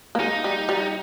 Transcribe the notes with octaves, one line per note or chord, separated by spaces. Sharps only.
A#3
G#3 D#4
G3
G3